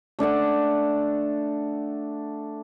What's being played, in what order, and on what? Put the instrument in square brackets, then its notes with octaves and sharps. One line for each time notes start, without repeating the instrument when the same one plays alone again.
[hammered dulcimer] A3 D4 A4 F#5